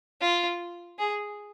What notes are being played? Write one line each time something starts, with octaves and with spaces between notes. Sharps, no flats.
F4
G#4